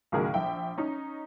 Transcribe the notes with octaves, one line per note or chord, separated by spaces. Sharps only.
C#2 A2 D#3 F#3 G#4 A#4
A#1 E5 G5
C#4 D#4